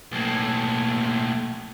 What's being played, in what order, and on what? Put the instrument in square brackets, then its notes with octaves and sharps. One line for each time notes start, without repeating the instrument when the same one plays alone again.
[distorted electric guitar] B1 A2 [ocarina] A#3